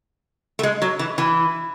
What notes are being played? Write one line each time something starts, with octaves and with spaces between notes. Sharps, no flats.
A3
G#3
F#3
E3
E3